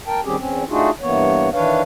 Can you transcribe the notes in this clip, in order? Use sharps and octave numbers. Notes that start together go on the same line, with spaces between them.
A#4 G5 A5
D#3 G3 C4 C#4 G4 G#4
E2 C4 C#4
A3 D4 D#4 F4 F#4 G#4
G2 E3 A#3 B3 C#5
D#3 E3 D4 B4 C#5 F5